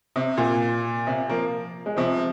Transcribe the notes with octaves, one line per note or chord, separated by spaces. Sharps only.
C3
A#2
C3
F3 A#3
G#3
C3 F3